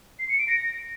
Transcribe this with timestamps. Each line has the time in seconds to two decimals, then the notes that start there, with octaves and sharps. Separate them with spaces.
0.19 C7
0.29 C#7
0.38 D7
0.48 A#6